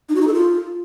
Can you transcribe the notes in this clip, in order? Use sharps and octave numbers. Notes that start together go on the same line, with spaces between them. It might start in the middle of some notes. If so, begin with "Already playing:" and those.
D#4
F#4
D#4
A4
F4